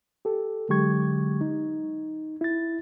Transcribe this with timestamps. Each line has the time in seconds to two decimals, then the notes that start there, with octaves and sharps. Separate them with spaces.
0.25 G4 A4
0.69 D3 F#3 G#3 G4 C#6 G#6
1.41 D#4
2.41 E4 A6